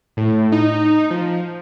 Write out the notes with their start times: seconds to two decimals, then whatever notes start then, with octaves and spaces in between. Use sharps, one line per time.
0.17 A2
0.52 D#4
1.10 F3